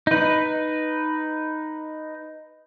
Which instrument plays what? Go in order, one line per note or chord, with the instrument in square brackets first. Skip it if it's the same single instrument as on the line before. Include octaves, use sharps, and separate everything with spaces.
[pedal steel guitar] D#4 B4